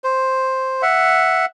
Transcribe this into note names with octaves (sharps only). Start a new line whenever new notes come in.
C5
E5 F#5